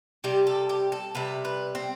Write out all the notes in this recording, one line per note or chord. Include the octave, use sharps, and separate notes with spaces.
C3 G3 G4
A4
G4
A4
C3 G3 B4
B4
C4